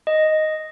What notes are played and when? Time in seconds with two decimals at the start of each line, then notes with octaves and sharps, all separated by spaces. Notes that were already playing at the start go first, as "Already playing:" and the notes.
0.07 D#5